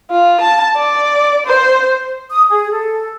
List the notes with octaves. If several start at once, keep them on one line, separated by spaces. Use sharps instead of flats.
F4
A5
D5
C5
D#6
G#4
A4